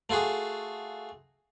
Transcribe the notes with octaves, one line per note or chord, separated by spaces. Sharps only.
A3 F4 F#4 G#4